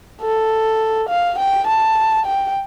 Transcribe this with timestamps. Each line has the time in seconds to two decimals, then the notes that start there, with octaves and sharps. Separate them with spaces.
0.22 A4
1.09 F5
1.39 G5
1.67 A5
2.26 G5